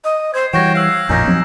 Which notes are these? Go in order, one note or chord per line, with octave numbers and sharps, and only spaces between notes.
D#5
C5 G#6 C7
E3 G3 F#4 C#5 G5 G#6 A#6 E7
F5 E6 F#6 D7
A1 F2 A#2 A#3 C#4 D#4 G6 A#6
F3 F#3 C4